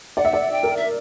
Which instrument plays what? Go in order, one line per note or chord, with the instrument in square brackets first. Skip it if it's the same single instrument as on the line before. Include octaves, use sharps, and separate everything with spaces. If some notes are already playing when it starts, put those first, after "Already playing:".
[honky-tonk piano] D5 [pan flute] F#5
[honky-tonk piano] E5
D5
[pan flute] G5
[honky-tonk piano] A#4
[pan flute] E5